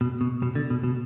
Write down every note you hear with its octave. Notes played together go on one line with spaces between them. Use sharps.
B2
B2
B2
D3
B2
B2